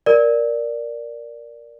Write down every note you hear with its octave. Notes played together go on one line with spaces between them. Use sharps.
A#4 D5